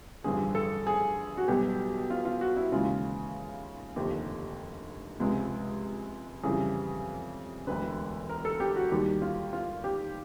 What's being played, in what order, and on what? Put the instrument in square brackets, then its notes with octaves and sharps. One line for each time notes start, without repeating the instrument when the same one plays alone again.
[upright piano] A1 G2 D3 F3 G#4
A4
G#4
F#4
B1 B2 G3 G4
F4
F4
F#4
E4
D#2 C#3 E3 G#3 F4
F1 D#2 D3 F3 G4
C#2 C3 F3 G#3
F2 C#3 E3 G3 G#4
E1 D2 D3 B4
A#4
A4
G4
F#4
D#2 D#3 G3 G4
F4
F4
G4